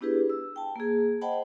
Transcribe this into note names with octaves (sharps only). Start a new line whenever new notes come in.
B3 D4 E4 G4 G#4 B4
E6
G5 A5
A#3 G#4
C5 D#5 F#5 G5 A5 B5